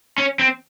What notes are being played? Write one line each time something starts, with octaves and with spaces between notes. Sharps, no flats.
C#4
C4